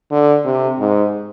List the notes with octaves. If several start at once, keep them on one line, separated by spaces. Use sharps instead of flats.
D3
C3
G#2